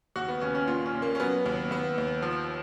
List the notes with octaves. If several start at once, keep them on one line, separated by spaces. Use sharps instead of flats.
D#2 F#4
B3
D#2 C#4
C#4
A#2 F4
C#4
A#2
A#3
C#4
F#3 B3
D#2 B3
D#2 B3
D#2
F3